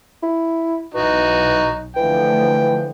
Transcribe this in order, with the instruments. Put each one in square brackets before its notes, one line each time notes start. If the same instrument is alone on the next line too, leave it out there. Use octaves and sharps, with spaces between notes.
[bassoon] E4
[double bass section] B1 [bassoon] E3 [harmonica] D#4 F#4
[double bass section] D3 F3 A3 [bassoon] E3 [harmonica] G5